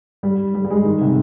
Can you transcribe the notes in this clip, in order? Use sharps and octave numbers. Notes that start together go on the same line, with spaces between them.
G3
G3
G3
G#3
D#3
C3